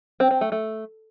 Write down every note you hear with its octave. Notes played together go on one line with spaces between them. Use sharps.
C4
C4
A3
A3